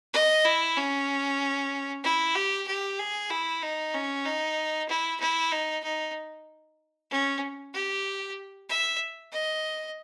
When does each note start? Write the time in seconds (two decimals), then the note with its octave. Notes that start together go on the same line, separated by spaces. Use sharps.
0.13 D#5
0.45 E4
0.77 C#4
2.04 E4
2.35 G4
2.67 G4
2.99 G#4
3.30 E4
3.62 D#4
3.94 C#4
4.25 D#4
4.88 E4
5.20 E4
5.52 D#4
5.83 D#4
7.11 C#4
7.74 G4
8.69 E5
9.32 D#5